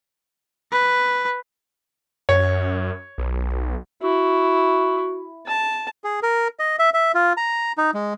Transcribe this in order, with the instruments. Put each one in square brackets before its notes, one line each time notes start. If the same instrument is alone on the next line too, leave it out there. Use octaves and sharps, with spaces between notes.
[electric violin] B4
[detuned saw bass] F#2 [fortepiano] C#5
[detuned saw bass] B1
[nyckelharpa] E4 [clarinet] F#4
[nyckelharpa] A5
[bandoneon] G#4
A#4
D#5
E5
E5
F4
A#5
D#4
G#3